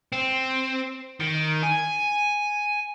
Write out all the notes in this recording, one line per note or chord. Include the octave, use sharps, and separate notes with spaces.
C4
D#3
G#5